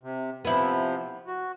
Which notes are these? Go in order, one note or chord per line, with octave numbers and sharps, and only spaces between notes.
C3
C3 F3 B3 E4
F#4